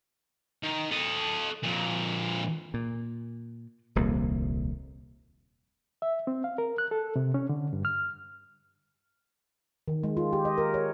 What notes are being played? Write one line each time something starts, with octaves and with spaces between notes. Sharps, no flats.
D#3
A4 D#5
F2 A#2
A#2
D#1 C2 F2 A#3
E5
C4
F5
A#4
F#6
A4
C3
C#4
D3
G2
F6
D#3
G#3
F4
G4
D#5
A#4
C#5